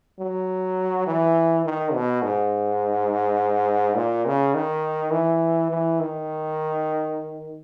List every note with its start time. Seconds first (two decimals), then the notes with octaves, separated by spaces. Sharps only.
0.20 F#3
1.07 E3
1.65 D#3
1.94 B2
2.23 G#2
3.96 A#2
4.26 C#3
4.54 D#3
5.12 E3
5.70 E3
6.00 D#3